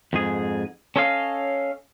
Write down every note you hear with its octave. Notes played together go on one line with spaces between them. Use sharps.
F2 G#2 G#4
C#4 A4 C#5 D#5 F5